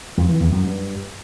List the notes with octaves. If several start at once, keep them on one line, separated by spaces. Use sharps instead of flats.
F2
E3
E2
F#2
G2